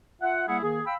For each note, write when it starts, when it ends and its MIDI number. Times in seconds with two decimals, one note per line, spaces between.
0.22 0.48 65
0.22 0.48 76
0.22 0.48 78
0.48 0.61 55
0.48 0.61 58
0.48 0.61 64
0.48 0.61 68
0.48 0.61 78
0.63 0.81 51
0.63 0.81 58
0.63 0.81 68
0.86 0.95 77
0.86 0.95 79
0.86 0.95 83
0.86 0.95 88